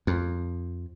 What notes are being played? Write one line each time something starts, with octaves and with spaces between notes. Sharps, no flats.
F2